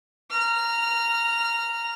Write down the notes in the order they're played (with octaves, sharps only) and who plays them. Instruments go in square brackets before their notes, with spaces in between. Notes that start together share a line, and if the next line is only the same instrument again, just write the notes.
[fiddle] A#5 F6